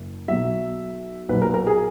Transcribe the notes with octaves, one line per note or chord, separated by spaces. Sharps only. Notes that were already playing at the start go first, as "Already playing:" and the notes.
Already playing: F#1
B1 B2 F#3 E5
B1 A#2 F#3 B4
A#4
A#4
G#4